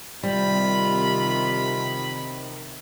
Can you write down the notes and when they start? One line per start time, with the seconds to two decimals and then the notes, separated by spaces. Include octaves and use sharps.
0.23 C3 D#3 G3 F4 B5